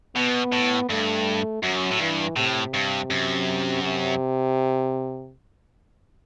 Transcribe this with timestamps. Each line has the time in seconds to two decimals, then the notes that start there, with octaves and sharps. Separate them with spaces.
0.16 B2 B3
0.52 A2
0.90 G2 A3
1.63 F#2 F#3
1.91 A2
2.00 G2 E3
2.36 A2 C3
2.74 G2
3.10 F#2
3.83 C3